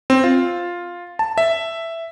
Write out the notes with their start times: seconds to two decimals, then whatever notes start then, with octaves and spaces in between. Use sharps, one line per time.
0.10 C4
0.24 F4
1.19 A5
1.38 E5